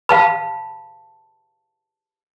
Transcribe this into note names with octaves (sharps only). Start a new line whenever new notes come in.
F5 A5 B5